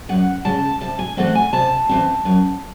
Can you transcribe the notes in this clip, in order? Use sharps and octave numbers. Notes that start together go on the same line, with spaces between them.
F#2 F#5
C#3 G#3 A5
C3 A5
G#5
E3 A3 C4 F#5
G#5
C3 A5
E3 A3 C4
F#2